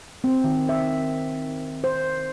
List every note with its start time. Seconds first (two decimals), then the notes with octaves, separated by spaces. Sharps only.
0.24 C4
0.44 D#3
0.69 E5
1.84 C5